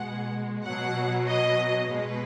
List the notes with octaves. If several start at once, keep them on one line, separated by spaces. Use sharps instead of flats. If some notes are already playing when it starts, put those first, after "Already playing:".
Already playing: B2 G#3 F#5
B2 F#3 F#5
D#5
B2 G#3 B4